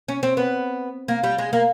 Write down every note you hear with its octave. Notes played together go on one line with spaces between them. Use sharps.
C#4
C4
B3
A#3
G3
G#3
A#3